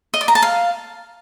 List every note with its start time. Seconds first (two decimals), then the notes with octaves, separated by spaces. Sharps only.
0.14 D#5
0.21 D5
0.28 A#5
0.35 A5
0.42 F5